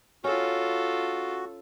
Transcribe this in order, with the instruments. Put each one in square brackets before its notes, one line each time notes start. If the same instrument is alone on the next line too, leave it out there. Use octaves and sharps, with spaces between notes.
[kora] C#4 [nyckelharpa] F4 A4 [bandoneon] F#4